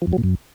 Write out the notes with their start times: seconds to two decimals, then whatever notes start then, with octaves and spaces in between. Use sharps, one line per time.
0.02 F3
0.07 F2
0.13 F#3
0.18 A#2
0.24 F#2